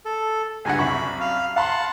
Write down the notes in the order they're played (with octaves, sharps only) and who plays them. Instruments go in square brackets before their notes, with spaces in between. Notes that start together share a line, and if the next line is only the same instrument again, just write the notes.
[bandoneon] A4
[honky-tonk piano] C#2 G2 F#5 [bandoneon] G#5
[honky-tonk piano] C2 F#2 C#6 [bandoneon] B5
[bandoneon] F5
[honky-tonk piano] F5 B5 C6 [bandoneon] F#5 A5